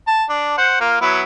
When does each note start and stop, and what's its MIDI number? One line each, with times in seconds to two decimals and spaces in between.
0.07 0.24 81
0.29 0.55 62
0.58 0.76 72
0.58 0.76 78
0.80 1.01 58
0.80 1.01 65
1.01 1.24 54
1.01 1.24 59
1.01 1.24 64